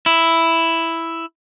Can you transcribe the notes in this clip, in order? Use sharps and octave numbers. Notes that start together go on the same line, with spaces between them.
E4